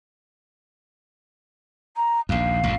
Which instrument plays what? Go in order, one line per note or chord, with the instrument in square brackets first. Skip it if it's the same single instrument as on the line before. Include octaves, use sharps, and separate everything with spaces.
[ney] A#5
[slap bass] A#1 D#2 [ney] F5
[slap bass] A1 F2